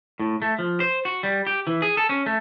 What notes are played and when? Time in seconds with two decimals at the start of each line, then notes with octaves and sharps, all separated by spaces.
0.20 A2
0.42 A3
0.59 F3
0.80 C5
1.05 F#4
1.23 G3
1.47 G4
1.67 E3
1.82 G#4
1.97 A4
2.09 C#4
2.26 A3